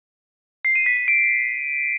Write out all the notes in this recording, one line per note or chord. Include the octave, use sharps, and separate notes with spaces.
C7
D#7
B6
B6
D7